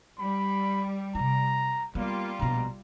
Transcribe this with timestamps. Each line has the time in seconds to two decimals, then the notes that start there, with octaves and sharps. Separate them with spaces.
0.19 G3 B5
1.15 C3 F4 A#5
1.95 G3 A#3 B3 F4
2.39 A#1 B2 A#5